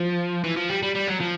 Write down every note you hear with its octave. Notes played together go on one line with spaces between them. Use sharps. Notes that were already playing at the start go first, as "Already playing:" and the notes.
Already playing: F3
E3
F3
G3
G3
G3
F#3
F3